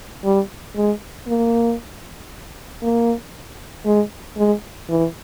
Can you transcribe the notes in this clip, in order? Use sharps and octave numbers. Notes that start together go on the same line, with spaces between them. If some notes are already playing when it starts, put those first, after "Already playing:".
G3
G#3
A#3
A#3
G#3
G#3
E3